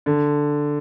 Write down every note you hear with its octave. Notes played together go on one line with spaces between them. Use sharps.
D3